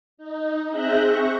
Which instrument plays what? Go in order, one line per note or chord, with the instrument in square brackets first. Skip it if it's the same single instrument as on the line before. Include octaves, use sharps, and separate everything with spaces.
[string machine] D#4
C4 G#4 E5 F#6 G6 A#6
C#6